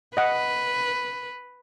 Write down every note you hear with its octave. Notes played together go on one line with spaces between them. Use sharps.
B4 D#5 F#5